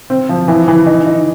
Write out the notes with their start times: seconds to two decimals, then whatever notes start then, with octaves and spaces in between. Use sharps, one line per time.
0.10 C4
0.29 F3
0.48 E3
0.68 E3
0.86 D#4
1.06 D#4